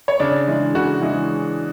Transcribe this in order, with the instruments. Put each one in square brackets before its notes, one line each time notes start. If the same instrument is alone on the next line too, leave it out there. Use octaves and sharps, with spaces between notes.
[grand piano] C#5
C#3 D4 D5
E3 G#3
C#3 F#4
E3 G#3